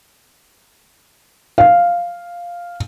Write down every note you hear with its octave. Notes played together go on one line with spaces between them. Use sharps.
F5